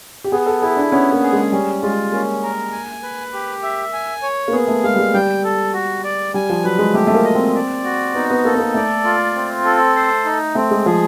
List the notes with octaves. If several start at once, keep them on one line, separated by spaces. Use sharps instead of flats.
G4
B3 G#4
A4
E4 G#4
D4
B3 C#4
A#3
G#4
G#3
G3 C#4
G#3 F4
A#3 C#4
A#4
G#5
B4
G4
E5
G#5
C#5
A#3
B3 G#4
A3
G#3 F5
G3
G#3
G3 G5
A4
F#4
D5
G3 G#5
F3
F#3 B4
G#3
A3 G4
A3
A#3
D#5
C4
D5
F#4
B3 D#4
B3
A#3 A4
B3
A#3
A3 D5
F4
C4
A4
C5
D#4
A3 C4
G#3
F3 G#4